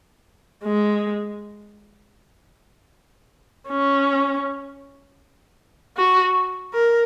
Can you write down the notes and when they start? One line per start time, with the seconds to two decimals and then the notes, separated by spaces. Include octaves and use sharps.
0.64 G#3
3.69 C#4
5.97 F#4
6.74 A#4